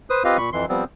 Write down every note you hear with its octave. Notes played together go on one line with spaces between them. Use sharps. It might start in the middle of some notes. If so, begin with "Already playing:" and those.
B4 C5 D#6
C4 F4 G4 B4 D#5 F5
A#2 B5 C#6
F2 E3 C6
F3 G3 B3 C4